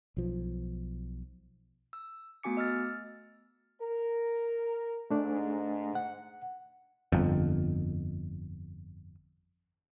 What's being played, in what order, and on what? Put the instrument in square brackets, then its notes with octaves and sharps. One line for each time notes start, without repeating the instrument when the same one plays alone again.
[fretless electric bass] B1 F3
[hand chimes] E6
A3 B3 F#4 G#5 D6 C#7
D#5 E6 F6 A6
[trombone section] A#4
[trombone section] G#2 [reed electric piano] A3 D4
[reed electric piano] F#5
[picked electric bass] G1 F2